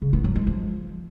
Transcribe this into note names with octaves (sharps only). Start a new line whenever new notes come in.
C#3
B3
F#3
G#3
F3